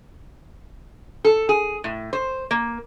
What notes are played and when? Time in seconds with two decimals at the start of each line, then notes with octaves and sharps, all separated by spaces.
1.25 A4
1.49 G#4
1.84 A2
2.13 C5
2.51 A#3